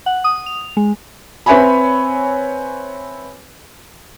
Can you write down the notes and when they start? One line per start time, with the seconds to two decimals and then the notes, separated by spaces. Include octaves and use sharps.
0.06 F#5
0.24 D#6
0.46 F7
0.77 G#3
1.46 C4 B4 C#5 E5 G#5 B5